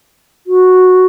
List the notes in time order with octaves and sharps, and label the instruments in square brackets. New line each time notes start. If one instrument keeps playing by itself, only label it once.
[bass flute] F#4